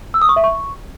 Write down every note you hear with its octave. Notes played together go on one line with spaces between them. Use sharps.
E6
D#6
C#6
E5
C#6